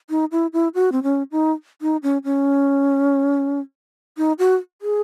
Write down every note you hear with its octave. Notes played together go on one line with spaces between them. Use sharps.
D#4
E4
E4
F#4
C4
C#4
D#4
D#4
C#4
C#4
D#4
F#4
G#4